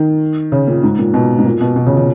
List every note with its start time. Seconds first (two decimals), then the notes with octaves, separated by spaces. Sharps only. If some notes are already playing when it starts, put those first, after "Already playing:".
Already playing: D#3
0.52 C#3
0.68 A#2
0.83 G#2
0.99 A#2
1.14 B2
1.38 G#2
1.45 A#2
1.61 B2
1.76 B2
1.87 C#3
1.97 C#3